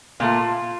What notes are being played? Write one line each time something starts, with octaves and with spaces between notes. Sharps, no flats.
A#2 A3 F4